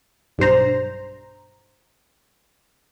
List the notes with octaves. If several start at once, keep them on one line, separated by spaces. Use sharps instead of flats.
B1 G2 D4 C5 A#5